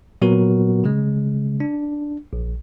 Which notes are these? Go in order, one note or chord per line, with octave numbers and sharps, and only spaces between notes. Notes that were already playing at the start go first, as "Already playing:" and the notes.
A#2 F#3 B3 F#4 A#4
C#3 G#3
D4
A#1